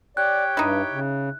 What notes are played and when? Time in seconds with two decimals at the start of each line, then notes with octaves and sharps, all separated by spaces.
0.17 G4 C#5 D5 G5 F#6
0.57 G2 D#4 E4
0.92 C#3